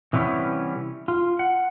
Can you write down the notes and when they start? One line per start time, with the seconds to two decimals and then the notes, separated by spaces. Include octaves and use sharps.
0.13 C3 E3 G3 B3 C#4 E4
1.08 F4
1.39 F#5